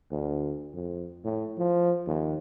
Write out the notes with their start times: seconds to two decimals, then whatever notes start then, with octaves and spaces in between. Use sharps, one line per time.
0.11 D2
0.74 F2
1.24 A2
1.58 F3
2.07 D#2